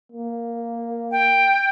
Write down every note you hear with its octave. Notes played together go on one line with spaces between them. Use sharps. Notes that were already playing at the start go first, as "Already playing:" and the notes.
A#3
G5